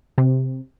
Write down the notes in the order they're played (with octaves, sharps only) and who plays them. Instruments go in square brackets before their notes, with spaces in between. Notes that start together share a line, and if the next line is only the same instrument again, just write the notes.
[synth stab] C3